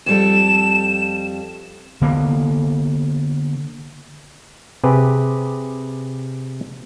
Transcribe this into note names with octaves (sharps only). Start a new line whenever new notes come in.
F2 G3 A4 E7
D3 A#3 B3
C3 G4 G#4 B4